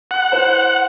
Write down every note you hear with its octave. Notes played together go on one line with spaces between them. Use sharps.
F#5
E4 B4 C5